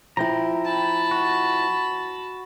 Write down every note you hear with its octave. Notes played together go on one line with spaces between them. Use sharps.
F3 E4 G5 A#5
A5 B5
F#4